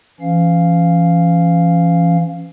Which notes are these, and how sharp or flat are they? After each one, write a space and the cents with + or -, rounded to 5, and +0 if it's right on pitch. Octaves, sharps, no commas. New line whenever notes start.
E3 +30 C#4 +0 F5 +0